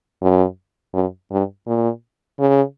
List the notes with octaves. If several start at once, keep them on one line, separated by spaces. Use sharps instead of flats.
F#2
F#2
G2
A#2
C#3